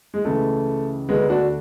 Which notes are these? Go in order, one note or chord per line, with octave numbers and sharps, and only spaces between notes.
G#3
C#2 C#3 E3 A3
D2 D3 G#3 B3
D4 F#4